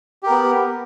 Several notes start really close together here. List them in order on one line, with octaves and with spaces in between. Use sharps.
G4 A#4 B3